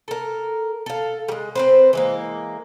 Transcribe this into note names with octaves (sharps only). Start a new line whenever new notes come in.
A4 A#4
A4 F5
G3 G#3
C4 B4 C5
E3 G#3 A#3